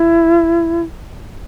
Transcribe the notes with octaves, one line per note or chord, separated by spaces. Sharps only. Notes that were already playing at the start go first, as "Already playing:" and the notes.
Already playing: E4